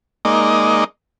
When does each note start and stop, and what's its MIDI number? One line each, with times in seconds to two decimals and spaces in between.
0.25 0.84 56
0.25 0.84 58
0.25 0.84 63
0.25 0.84 74
0.25 0.84 75